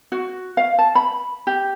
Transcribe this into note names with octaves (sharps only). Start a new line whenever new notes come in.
F#4
F5
A5
B5
G4